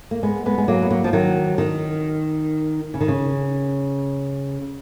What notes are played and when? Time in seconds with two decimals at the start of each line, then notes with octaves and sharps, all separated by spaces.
0.11 A#3
0.23 G#3 B3
0.46 G#3 B3
0.58 G#3
0.68 F#3 A#3
0.82 B3
0.90 F#3 A#3
1.04 F3
1.13 D#3 F#3
1.58 D#3
2.94 C#3
3.01 D#3
3.08 C#3